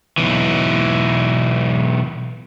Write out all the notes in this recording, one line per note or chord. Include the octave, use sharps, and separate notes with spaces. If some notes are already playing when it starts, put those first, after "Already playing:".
B1 E3